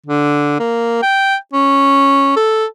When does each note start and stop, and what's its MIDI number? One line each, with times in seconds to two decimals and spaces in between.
0.06 0.56 50
0.59 1.01 58
1.03 1.36 79
1.53 2.36 61
2.36 2.65 69